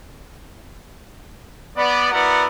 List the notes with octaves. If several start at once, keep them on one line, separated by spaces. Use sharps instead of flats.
B3 D5
B3 E4 F#4 A#4 D5 F#5